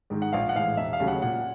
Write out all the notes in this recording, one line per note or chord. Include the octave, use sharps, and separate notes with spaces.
G#2 D#3 G#3
F#5
A#1 F5
F#5
A2 E3 G#3 F5
E1 E5
F5
D#2 C#3 F#3 A3
F#5
A#2 F#5